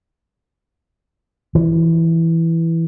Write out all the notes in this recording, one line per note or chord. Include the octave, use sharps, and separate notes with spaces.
E3